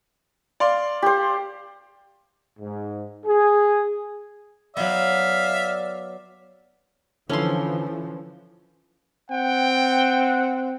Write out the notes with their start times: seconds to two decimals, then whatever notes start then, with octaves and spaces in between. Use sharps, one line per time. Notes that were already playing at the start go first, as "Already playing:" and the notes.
0.60 D5 F5 C6
1.02 G4 C5
2.59 G#2
3.25 G#4
4.77 F#3 B3 D5 E5 F5
7.30 D3 E3 F3 C#4 E4 A4 C6
9.31 C4 F#5 G5